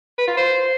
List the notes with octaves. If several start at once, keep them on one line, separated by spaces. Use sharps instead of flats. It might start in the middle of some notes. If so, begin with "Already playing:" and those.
B4
F4
C5